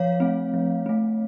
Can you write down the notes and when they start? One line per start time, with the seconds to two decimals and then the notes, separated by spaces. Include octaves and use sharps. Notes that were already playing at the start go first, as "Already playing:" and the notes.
Already playing: F3 C#5 F5
0.20 A3 C4
0.54 F3
0.86 A3 C4